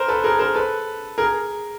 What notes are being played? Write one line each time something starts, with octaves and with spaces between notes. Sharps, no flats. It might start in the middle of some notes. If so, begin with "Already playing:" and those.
Already playing: A#4 C5
A4 B4
G#4 A#4
A#4 C5
A4 B4
G#4 A#4